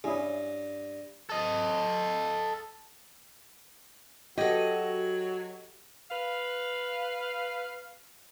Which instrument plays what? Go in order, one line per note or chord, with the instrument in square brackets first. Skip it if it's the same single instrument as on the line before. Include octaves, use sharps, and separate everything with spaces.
[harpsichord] G2 [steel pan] C#4 E4 G#4
[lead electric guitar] A4 D#5
[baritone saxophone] F#3 [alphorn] F#4 [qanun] G4 A4 [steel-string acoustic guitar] D#5
[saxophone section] B4 F5